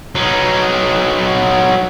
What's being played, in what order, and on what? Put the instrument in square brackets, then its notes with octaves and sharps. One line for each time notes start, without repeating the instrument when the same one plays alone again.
[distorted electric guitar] F#3 D#4